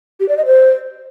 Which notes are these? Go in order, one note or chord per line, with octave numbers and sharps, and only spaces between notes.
G4
D5
D#5
C5